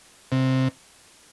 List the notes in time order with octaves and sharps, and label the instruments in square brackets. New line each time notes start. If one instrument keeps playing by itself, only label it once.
[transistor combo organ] C3